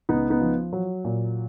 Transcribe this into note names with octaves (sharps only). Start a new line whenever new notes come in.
C#2 B3 D#4
B3 D#4
F3
F#3
A#2